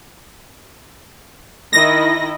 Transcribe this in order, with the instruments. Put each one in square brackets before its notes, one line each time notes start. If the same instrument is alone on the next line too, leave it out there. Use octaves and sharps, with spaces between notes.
[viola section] D#3 E4 D#5 [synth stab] A#6